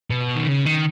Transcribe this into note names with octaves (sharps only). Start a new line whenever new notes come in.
B2
D#3
C#3
D#3